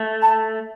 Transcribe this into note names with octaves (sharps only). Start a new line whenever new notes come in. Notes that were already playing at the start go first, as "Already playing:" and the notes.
Already playing: A3
A5